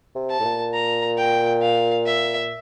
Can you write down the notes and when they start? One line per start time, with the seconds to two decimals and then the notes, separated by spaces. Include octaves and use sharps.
0.15 C3
0.30 A5
0.40 A2
0.44 A#2
0.74 A#5
1.17 G5
1.62 F5
2.06 E5